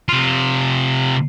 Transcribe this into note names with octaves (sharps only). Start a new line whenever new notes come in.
C3 F4